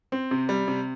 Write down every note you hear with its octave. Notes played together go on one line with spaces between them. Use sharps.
C4
C3
G3
C3